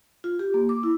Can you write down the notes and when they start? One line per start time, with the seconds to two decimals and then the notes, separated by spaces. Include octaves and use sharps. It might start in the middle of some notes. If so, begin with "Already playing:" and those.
0.24 F4
0.39 G4
0.54 A#3
0.69 D6
0.83 E4